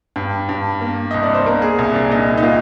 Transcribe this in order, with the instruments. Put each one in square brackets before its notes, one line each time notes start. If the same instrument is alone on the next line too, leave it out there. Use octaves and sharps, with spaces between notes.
[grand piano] G2
G2
A#3
C2 D#5
D5
C5
A#3 A#4
G#4
C2
D4
A#2 D#4
D#4
A#2 F4